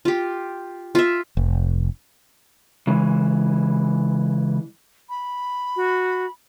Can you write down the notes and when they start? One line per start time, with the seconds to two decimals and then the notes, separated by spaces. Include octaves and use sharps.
0.05 F4 G4
0.95 F4 E5
1.37 F1
2.87 C#3 E3 G#3
5.09 B5
5.76 F#4